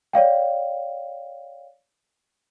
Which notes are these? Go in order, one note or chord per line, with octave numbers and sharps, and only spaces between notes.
C#5 D5 F5 G5